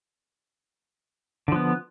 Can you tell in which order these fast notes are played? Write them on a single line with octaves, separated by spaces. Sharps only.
D3 F3 B3